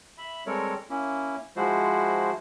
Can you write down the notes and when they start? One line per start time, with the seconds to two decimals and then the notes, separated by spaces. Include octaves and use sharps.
0.18 E5 B5
0.46 G3 G#3 C4 A4 A#4 C#5
0.89 A#3 C#4 E4
1.56 F3 G#3 E4 F#4 C5